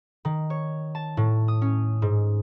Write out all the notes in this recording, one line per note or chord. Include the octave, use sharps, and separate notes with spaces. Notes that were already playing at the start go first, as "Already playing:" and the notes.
D#3
C#5
A5
A2
D#6
C#4
G#2